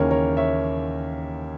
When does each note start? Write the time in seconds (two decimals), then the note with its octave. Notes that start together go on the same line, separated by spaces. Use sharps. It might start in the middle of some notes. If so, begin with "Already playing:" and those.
Already playing: D#2 C#3 E3 A#3 C#4 A#4 C#5
0.11 A#4 C#5
0.37 C#5 E5